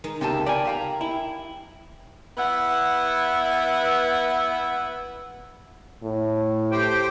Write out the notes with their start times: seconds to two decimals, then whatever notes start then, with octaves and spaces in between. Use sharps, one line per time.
0.04 D#3 G#3 D#4
0.21 C#2 C3 F4 G4 A4 A#4 A5
0.46 G4 A#4 D5 G#5
0.65 G4 F5 A#5
1.01 E4 G5
2.37 B3 E4 F#5
6.03 A2
6.72 G4 C5 G5